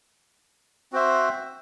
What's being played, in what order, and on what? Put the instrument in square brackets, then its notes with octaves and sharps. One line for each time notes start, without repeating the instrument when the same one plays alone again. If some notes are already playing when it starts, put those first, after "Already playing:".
[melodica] C4 F#4 C5 E5